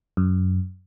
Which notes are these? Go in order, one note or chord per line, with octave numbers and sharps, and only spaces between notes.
F#2